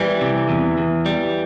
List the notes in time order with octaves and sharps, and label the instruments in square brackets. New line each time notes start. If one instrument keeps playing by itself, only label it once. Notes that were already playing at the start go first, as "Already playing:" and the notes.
Already playing: [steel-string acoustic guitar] E3 [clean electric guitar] G3
[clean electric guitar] C3
E2
E2
G3